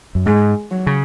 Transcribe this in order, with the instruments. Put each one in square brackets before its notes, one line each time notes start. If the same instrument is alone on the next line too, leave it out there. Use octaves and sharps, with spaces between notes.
[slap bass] F#2
[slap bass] G#2 [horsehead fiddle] G#3
[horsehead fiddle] F#3
[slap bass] C#3